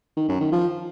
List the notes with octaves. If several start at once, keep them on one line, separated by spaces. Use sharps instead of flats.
D#3
F#2
D#3
F3